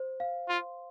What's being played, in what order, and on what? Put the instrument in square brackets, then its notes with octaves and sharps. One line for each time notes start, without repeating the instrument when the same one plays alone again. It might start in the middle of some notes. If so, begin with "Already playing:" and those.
Already playing: [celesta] C5
F5
[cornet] F4 [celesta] C6